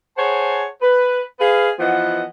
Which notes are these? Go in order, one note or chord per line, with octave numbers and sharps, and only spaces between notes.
G#4 C5 C#5 F#5 G#5 A5
B4
G#4 B4 D#5 F5
E3 F3 B3 D#5 F#5